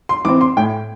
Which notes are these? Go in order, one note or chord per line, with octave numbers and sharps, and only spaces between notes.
C6
E3 C4 D6
C6
A2 G5